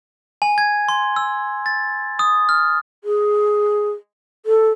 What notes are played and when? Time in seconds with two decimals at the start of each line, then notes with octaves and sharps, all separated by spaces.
0.42 G#5
0.58 G#6
0.89 C6
1.16 E6
1.66 A6
2.19 D#6
2.49 F6
3.04 G#4
4.46 A4